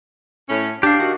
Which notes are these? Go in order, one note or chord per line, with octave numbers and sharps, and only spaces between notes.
A2 C#4
D4 G4 F5
D#3 F#4